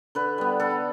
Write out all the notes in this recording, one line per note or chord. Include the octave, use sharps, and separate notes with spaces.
D3 B4
G3 B3
D3 A4